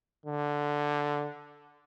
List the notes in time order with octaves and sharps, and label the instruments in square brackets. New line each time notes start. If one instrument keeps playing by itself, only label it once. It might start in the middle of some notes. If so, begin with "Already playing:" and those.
[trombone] D3